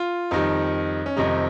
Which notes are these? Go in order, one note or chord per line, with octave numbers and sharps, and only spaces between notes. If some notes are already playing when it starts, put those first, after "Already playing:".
Already playing: F4
F2 D#3 G3 D#4
C#4
F2 C3 D#3 G3 D#4